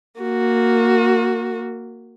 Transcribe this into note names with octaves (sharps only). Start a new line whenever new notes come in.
A#3 F#4